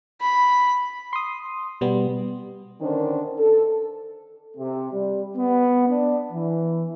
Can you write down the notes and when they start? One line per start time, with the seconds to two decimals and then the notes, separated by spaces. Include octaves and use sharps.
0.21 B5
1.13 C6 D#6
1.81 B2 G3 B3
2.81 D3 D#3 C#4 D4 A#4 C5
3.38 A4
4.57 C3
4.92 G3
5.37 B3
5.88 D4
6.32 E3